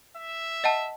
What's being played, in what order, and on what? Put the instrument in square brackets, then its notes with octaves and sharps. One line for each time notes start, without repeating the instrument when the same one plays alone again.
[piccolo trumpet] E5
[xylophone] D#5 F#5 A5